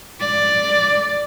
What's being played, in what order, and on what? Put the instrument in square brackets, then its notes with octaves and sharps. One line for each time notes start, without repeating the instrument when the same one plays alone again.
[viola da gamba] D5